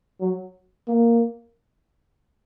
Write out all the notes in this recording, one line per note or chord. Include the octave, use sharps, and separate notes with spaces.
F#3
A#3